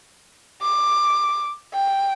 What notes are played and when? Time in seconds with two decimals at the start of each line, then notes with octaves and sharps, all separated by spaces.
0.62 D6
1.74 G5